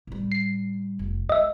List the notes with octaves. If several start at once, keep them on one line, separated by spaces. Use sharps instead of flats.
A2 G3
C7
F1
G#3 D#5 E5